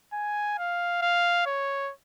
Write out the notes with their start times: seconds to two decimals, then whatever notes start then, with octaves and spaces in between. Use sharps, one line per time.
0.13 G#5
0.58 F5
1.02 F5
1.46 C#5